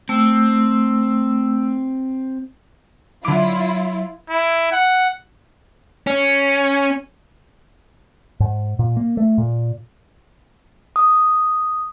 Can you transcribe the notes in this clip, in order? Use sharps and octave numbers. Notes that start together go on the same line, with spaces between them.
A3 C4 E6
D3 F#3 E4 F4 D6
E4
F#5
C#4
G#2
A#2
A#3
A3
A#2
D#6